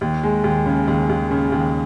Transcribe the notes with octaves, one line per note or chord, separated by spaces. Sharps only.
D#2
G#3
D#2
C#3
D#2
D#2
C#3
D#2